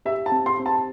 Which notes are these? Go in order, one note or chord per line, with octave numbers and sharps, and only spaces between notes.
G4 E5
A5
C4
C6
C4
A5